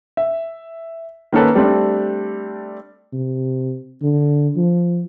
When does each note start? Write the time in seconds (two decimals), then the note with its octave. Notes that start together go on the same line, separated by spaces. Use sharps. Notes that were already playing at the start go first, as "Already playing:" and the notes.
0.17 E5
1.32 D#3 A#3 C#4 A4 B4
1.55 G3 A3 C4 D4
3.13 C3
4.02 D3
4.57 F3